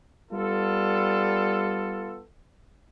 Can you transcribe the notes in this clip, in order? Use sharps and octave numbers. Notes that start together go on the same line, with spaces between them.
G3 B3 F4 A4